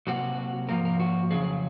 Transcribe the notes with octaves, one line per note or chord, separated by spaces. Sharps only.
C3 F#3 A#3 F#4
G#2 F3 A#3 A#4
A#4
F#4
F2 C#3 F#3 A#3 G#4